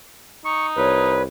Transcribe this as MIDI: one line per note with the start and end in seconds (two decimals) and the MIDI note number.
0.45 1.15 63
0.45 0.66 85
0.77 1.26 36
0.77 1.22 71
0.77 1.22 73